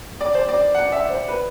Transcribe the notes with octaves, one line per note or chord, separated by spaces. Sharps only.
D5
C5
D5
F#5
E5
C5
B4